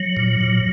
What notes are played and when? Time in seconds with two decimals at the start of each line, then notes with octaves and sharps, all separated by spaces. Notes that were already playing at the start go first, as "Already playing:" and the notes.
Already playing: F#3
0.17 A#2
0.40 A#2